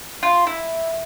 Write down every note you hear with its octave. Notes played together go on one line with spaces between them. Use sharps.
F4
E4